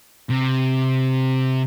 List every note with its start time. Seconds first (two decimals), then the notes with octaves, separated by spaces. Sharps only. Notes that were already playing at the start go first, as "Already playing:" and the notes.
0.30 C3